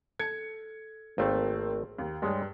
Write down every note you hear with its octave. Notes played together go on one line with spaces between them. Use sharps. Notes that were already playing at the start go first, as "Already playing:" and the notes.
A4 G#6 C#7
G#1 A3 A#3 C4 C#5
D#2
G2 G3 G#3 C#5